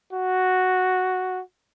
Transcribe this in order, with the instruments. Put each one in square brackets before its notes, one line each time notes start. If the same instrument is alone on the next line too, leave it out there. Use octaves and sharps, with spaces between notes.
[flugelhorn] F#4